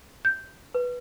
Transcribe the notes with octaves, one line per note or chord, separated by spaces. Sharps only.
G6
B4